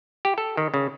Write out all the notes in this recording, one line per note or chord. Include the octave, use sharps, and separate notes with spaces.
G4
A4
D#3
C#3